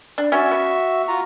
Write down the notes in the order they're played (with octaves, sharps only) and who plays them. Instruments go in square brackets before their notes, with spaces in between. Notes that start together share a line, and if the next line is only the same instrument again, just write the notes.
[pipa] D4
[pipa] C#4 D5 [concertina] F#4 E5
[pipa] B3
[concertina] F4 F#4 A#5